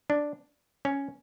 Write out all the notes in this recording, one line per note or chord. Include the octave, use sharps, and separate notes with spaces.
D4
C#4